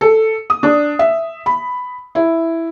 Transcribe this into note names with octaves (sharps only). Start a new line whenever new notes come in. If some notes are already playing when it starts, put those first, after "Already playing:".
A4
D#6
D4
E5
B5
E4